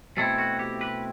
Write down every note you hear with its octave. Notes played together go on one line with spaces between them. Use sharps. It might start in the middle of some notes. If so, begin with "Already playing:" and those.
B2 A3 C4 E4 A4
F#4
G4
B4